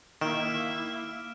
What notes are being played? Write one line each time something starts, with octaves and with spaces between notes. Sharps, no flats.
D#3 A#3 E4 E5 F6 D7 E7